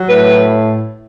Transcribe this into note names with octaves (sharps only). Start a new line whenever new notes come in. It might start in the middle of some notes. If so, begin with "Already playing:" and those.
Already playing: F#3
A2 B4